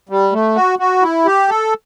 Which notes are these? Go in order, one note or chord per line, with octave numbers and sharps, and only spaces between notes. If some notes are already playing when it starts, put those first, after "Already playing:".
G3
A3
F#4
F#4
E4
G4
A4